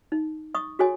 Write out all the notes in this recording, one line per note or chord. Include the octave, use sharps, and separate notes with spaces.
D#4
D#5 C#6 D#6
F#4 G#4 A4 C#5 D#5 G#5